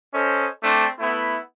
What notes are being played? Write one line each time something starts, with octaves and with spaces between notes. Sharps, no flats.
C#4 A4 C5 D#5
A3 C4 D4
A3 B3 E4